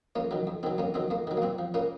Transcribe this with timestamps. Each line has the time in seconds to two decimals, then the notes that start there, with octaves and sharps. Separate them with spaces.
0.16 F2 A#3 C#4
0.31 D#3 F#3
0.47 F2
0.63 D#3 F#3 C4
0.78 F2 A#3 C#4
0.94 D#3 F#3 C4
1.10 F2 A#3
1.27 D#3 F#3
1.37 A#3
1.42 A#2 C4
1.59 F3
1.74 A#2 A#3 C#4